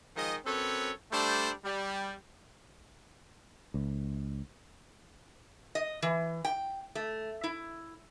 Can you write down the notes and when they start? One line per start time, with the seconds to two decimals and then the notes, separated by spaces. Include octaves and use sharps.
0.16 D#3 F3 G#3 D#5
0.45 F#2 C4 A4 B4 C#5
1.12 G3 A3 D4 A4 C5
1.64 G3
3.74 C#2
5.75 D#5
6.02 E3
6.45 G5
6.95 A3
7.44 E4